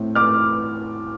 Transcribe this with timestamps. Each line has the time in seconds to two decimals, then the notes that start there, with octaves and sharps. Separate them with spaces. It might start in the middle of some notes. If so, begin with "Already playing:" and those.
Already playing: A2 C4
0.15 D6 F6